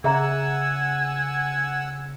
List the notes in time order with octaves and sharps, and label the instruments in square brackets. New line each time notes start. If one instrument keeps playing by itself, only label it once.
[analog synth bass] C#3 [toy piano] G#4 E5 A#5 [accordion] F#5 E6 [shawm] G#5